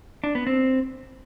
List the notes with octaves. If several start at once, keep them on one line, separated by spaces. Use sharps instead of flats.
D4
B3
C4